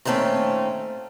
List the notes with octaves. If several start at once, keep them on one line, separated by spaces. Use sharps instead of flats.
A#2 D#3 G3 A3 C4 C#4